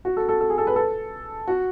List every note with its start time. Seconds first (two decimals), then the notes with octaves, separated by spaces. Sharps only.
0.05 F#4
0.17 A4
0.29 A4
0.40 A4
0.50 G#4
0.58 A4
0.67 B4
0.76 A4
1.48 F#4